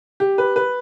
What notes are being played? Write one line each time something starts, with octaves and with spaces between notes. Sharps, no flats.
G4
B4
B4